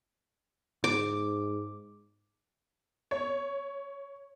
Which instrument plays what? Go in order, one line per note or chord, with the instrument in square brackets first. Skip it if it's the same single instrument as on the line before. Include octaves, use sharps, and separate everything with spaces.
[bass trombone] G#2 [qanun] D6
[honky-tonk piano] C#5